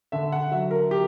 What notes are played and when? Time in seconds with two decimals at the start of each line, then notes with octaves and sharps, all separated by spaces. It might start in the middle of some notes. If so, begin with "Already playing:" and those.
0.12 D3 E5
0.32 F#5
0.51 F#3 E5
0.71 A#4
0.91 G4